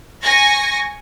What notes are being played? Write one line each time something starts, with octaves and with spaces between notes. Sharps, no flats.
G#5 C#6 A#6